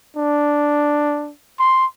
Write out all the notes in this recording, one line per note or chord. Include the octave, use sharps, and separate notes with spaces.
D4
C6